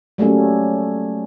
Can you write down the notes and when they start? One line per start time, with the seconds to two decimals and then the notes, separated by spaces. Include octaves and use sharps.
0.18 F#3 G3 A3 A#3 C#4